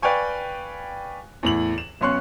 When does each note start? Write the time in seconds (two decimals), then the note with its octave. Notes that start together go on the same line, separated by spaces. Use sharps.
0.02 B4 D5 F5 G5 G#5 C#6
1.43 E2 A2 F#7
1.78 E7
2.01 B1 B3 C#4 C6 C#6 F#6